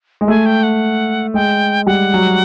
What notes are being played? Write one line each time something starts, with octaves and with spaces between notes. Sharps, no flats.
G#3
A3 G#5
G5
F#5
G#3 G5
G3 F#5
F#3